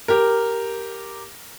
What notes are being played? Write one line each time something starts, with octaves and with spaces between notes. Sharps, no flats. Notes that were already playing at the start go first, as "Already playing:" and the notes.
G4 A#4